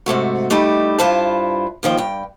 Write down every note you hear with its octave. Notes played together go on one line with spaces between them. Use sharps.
G#2 C3 A3 F#4
G3 A3 D#4 E4 G4
G2 E4 F4 B4 C5 A5
D#2 D#3 F3 G5
G2 G5